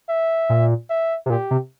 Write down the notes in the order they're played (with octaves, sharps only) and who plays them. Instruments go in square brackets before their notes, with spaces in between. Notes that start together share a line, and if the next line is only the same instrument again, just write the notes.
[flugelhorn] E5
[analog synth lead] A#2
[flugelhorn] E5
[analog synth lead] C3
[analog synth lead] A#2 [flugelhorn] G4
[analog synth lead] C3